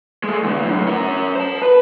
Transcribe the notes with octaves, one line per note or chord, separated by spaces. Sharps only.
G#3 A3
E2 D3
F#2 A2
C#4 A#4
C5 A5
B4 B5